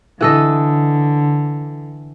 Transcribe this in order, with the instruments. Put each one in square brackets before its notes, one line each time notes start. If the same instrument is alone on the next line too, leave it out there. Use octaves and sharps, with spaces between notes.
[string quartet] D3 [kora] E3 A4 D#5